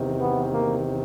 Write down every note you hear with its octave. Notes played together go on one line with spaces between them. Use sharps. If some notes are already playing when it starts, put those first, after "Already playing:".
Already playing: E2 C3 D#3
B3
A#3